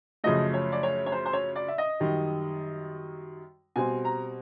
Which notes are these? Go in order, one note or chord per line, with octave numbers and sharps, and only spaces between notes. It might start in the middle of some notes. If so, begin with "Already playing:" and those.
F#2 C#3 F3 A3 D#5
C#5
D5
C#5
C#5
C5
C5
C#5
D5
E5
D#5
F#2 D#3 G3
B2 G3 C4 G#5
A#5